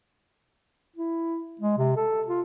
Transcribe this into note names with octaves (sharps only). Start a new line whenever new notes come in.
E4
G#3
C3
A4
F4